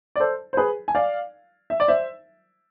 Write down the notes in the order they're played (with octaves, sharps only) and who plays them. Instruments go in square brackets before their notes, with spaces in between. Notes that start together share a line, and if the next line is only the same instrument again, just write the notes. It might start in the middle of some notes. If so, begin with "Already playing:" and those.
[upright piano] D5
A4 C5
C5
G#4 B4
G#5
D5 F5
E5
D5
C5 E5